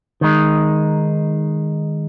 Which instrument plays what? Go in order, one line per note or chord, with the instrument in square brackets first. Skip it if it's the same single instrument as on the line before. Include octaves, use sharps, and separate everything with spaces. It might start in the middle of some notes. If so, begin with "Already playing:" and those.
[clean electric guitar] D#3 G#3 D#4